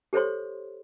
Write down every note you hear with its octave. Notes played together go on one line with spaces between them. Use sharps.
G4 A4 C5 C#5 C6